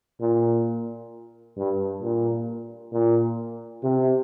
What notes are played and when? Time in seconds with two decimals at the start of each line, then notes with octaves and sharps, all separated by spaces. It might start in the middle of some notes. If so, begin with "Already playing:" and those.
0.20 A#2
1.57 G2
2.02 A#2
2.92 A#2
3.83 C3